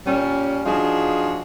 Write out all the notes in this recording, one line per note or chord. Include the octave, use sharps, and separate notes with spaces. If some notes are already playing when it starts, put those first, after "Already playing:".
A#2 G3 C#4
F3 D4 D#4 F4 F#4 G#4